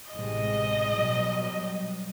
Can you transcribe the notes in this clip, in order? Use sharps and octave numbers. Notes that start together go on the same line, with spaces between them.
A1 C3 G#3 D#5
B2 F#3 G3